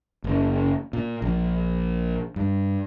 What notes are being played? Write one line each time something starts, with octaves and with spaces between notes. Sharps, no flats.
F#1
A#2
A#1
G2